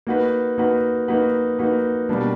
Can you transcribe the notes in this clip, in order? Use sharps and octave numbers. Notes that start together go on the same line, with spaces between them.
A#3 D#4 F#4 B4
A#3 D#4 F#4 B4
A#3 D#4 F#4 B4
A#3 D#4 F#4 B4
B2 G3 A#3 D4